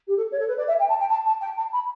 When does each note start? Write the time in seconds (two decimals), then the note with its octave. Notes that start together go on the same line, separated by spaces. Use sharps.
0.07 G4
0.17 A4
0.32 C#5
0.40 A4
0.48 B4
0.58 D5
0.68 E5
0.79 G5
0.89 A5
1.00 G5
1.10 A5
1.26 A5
1.41 G5
1.57 A5
1.73 B5